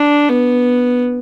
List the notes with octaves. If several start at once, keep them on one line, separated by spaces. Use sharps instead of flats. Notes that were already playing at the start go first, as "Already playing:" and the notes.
Already playing: D4
B3